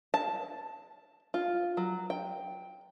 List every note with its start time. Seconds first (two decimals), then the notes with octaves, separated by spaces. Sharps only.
0.14 A5
1.34 F4
1.77 F#3
2.10 G5